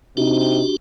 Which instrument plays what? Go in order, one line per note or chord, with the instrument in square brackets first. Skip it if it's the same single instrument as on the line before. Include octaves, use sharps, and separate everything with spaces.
[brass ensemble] C3 D#4 [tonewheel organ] D4 F#4 G4